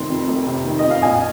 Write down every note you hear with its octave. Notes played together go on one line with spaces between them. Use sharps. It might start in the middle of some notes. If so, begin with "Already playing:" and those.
Already playing: F1 C3 D#3 C6
F2
F1
C3
D#3
D#5
F2
F5
A#1 D#5 G#5